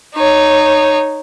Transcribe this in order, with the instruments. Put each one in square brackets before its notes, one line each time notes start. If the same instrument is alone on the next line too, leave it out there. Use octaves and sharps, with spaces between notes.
[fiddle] D#4 C#5